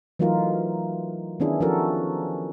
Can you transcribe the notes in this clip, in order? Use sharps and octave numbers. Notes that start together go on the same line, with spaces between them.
E3 F#3 A3 D#4 F4 A#4
D#3 B3 C#4 D4 E4 G#4
F3 C#4 E4 F#4 A4 A#4